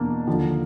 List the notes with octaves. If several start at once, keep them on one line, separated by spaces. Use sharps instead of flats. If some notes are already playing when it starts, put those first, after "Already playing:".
Already playing: E2 B2 A#3 D4
D#2 D3 F3